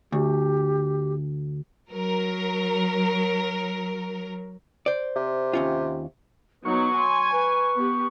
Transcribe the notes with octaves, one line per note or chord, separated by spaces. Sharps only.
D2 G4
F#3 A#4
C5 D5
C3
D#2 C#4 F4
F#3 B3 D#4 C#6
G#5 C6
B4
B3 G4